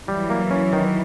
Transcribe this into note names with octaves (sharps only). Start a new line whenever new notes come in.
E3 F#3 G3
A#3
C#4
D#3